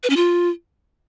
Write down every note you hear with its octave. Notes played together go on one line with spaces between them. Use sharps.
B4
C#4
F4